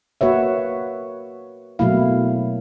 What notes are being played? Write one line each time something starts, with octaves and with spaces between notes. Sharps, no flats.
A#3 F#4 B4 C#5 E5
B2 F#3 A3 A#3 E4 F5